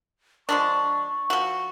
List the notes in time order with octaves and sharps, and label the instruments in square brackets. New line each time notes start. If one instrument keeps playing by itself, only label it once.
[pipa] F3 G#3 D4 [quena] C#6
[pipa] F3 F#4